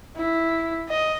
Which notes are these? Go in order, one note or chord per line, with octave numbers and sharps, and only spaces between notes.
E4
D#5